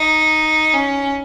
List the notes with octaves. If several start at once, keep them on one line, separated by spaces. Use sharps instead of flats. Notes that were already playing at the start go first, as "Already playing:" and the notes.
Already playing: D#4
C#4